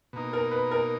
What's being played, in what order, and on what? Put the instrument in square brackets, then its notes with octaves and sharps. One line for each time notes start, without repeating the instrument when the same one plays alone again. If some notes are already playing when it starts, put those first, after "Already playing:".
[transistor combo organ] B2 A#3 D#4
[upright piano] A#4
B4
A#4